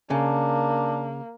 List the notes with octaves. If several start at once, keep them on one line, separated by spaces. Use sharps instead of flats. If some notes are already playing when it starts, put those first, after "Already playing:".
C#3 A#3 D4